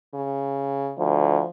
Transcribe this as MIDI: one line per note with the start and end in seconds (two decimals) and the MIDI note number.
0.14 0.93 49
0.98 1.43 38
0.98 1.50 53